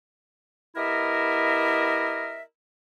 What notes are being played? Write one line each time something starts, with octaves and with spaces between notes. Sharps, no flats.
B3 E4 G4 A#4 D#5 E5